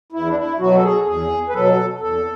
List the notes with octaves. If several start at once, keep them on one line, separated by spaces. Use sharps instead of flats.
E2 E4
D4
E4
B2 F#3 F#4
A4
G#4
E2 G#4
B4
B2 F#3 A4
E2 A4